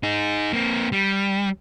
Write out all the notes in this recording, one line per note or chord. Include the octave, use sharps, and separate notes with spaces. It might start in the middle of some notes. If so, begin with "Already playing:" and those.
D#4 G#4
A#3 C4
G3